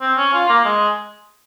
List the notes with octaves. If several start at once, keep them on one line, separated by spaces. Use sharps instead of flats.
C4
C#4
F4
A#3
G#3